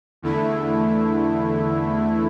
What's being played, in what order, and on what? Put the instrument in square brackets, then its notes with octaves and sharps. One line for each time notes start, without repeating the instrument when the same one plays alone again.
[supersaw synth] E2 D3 A3 E4